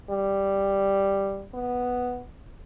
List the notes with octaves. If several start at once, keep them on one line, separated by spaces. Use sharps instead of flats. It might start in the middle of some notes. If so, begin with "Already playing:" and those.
G3
B3